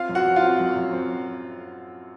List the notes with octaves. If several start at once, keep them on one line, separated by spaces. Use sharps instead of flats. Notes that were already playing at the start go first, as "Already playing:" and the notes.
Already playing: C4 F4 F5
F#2
F#4 F#5
F3
F4 F5
C4
F#2
F#2
C4